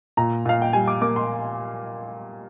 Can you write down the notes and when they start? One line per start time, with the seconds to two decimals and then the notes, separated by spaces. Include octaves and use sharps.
0.17 A#2 A#5
0.45 A#2 F5
0.62 G5
0.73 G3 G#5
0.88 D6
1.01 A#3 D6
1.16 C6